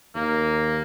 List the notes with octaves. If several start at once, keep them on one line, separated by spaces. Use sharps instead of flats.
D#2 A#3